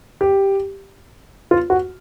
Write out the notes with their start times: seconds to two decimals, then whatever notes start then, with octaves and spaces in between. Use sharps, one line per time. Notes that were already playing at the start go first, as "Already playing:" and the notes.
0.21 G4
1.51 F4
1.70 F#4